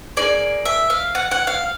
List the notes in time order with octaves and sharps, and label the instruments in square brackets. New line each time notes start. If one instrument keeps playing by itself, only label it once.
[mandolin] D#4 G#4 D5
A#3
E5
F5
F#5
F#5
F5